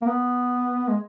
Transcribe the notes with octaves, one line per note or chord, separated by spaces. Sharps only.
A#3
B3
G#3